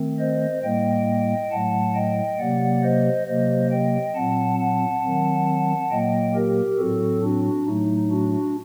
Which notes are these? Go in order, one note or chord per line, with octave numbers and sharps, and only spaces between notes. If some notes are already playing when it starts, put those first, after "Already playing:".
Already playing: D#3 A3 C4
C5 D#5
A2 G3 A#3 D#5 G5
A2 F#3 A3 F#5 A5
D#5 G5
C3 F#3 A#3 D5 F#5
C5 D#5
C3 F#3 A#3 C5 D#5
D#5 G5
A#2 F#3 C4 F#5 A5
F#5 A5
D#3 F#3 C4
A#2 F#3 A#3 D#5 G5
G4 A#4
A2 F#3 C4 F#4 A4
D4 F#4
A2 F#3 A3 D#4
D4 F#4